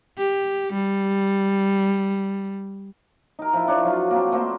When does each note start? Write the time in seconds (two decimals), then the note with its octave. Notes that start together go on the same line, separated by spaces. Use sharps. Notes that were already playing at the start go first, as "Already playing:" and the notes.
0.18 G4
0.73 G3
3.39 D#4 A#4
3.53 F3 E4
3.68 D4 C#5
3.84 F#3 F4
4.11 A#3 C4
4.32 A3 A#3 C5 C6